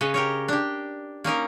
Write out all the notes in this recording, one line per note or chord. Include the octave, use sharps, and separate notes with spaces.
C#3 B4 C#5 D#5
G4 A#4 C#5
D4 G4
A#3 C#4 D#4 A#4